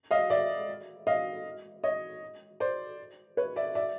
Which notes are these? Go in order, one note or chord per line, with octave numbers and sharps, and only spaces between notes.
D#5 F5
D5 E5
D#5 F5
C#5 D#5
C5 D5
B4 C#5
D5 E5
D5 E5